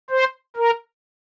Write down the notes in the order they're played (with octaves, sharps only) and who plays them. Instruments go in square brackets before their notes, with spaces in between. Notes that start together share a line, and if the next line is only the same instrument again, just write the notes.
[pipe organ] C5
A#4